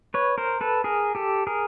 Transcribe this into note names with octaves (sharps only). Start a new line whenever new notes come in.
B4 C#5
A#4 C5
A4 B4
G#4 A#4
G4 A4
G#4 A#4